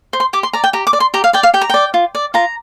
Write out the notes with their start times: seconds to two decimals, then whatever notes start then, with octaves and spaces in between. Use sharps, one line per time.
0.13 C5
0.20 C6
0.33 G4 D6
0.43 C6
0.53 D5 A#5
0.64 G5
0.73 G4 A#5
0.87 D6
0.93 D5
1.00 C6
1.14 G4 A#5
1.24 F5
1.33 D5 G5
1.43 F5
1.54 G4 G5
1.61 A#5
1.70 D5 G5
1.94 F4
2.15 D5
2.34 F4 A#5